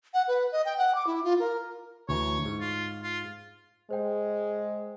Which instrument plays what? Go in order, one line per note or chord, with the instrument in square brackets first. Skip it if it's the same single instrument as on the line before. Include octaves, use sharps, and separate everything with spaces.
[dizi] F#5
B4
D#5
G5
F#5
D6
E4
F4
A#4
[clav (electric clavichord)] D2 E3 A#5 [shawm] C#5
[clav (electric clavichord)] G#2
[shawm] F4
F4
[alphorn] G#3 [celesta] C5 G5